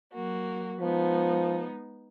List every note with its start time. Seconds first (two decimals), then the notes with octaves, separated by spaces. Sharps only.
0.12 F#3 A#3 F#4
0.80 F3 G#3 B3 D#4